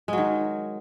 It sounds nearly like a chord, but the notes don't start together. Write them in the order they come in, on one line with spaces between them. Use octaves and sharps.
G#3 F#3 D#3